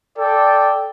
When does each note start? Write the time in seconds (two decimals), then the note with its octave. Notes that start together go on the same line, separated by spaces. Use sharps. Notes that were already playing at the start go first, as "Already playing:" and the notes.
0.17 A4 D5 G5